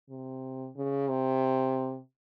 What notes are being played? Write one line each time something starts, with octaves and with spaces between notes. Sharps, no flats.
C3
C#3
C3